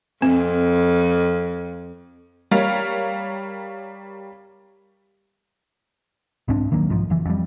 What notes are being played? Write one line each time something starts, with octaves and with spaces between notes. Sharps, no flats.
F2 C4
G3 A#4 C#5 F5
C2 G#2 C4 D4
D#1 D#3 F#3 A#3
B1 G#2 F3
F#1 E3
F2 G3